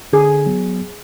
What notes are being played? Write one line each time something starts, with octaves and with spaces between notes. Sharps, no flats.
D3 G#4
F#3 B3